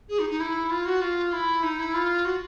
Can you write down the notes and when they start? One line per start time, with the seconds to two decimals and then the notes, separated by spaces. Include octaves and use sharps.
0.09 G#4
0.19 D#4
0.30 D#4
0.40 E4
0.71 F4
0.86 F#4
1.01 F4
1.33 E4
1.63 D#4
1.79 E4
1.94 F4
2.25 F#4